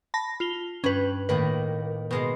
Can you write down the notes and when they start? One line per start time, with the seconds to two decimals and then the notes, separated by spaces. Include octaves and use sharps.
0.14 A5 B5 A#6
0.40 F4 F7 G7
0.84 G2 C#4 B4
1.29 A2 D#3 A#3 B4
2.11 B2 G#3 C6